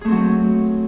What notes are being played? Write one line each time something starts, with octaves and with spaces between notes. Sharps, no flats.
F#3 A3 C4 G#4